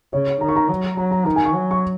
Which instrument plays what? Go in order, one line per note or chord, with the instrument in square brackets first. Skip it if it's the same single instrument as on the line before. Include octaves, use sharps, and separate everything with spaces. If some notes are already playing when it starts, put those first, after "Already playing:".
[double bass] C#3 [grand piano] C#5
[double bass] D#3 [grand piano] A#5
[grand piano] C#6
A#5
[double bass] F#3
[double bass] F#3 [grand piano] A#5
[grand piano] A#5
[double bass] D#3 [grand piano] A#5
[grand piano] G#5
C#6
[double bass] F#3
[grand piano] C#6